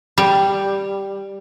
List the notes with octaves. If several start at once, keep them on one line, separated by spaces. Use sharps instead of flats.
G3